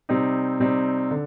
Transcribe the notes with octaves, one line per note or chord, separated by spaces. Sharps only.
C3 G3 C4 D#4
C3 G3 C4 D#4
D3